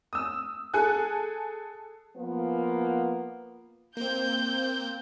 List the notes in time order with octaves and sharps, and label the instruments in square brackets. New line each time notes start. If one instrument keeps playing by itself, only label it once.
[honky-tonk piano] D#6 E6
G#4 A4 G#5 F#6
[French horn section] F3 A#3 B3
[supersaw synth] A#3 C4 [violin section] G6